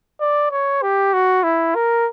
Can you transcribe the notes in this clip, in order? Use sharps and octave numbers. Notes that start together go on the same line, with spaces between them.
D5
C#5
G4
F#4
E4
A#4